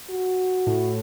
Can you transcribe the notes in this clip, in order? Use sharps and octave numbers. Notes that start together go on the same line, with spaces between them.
F#4
A2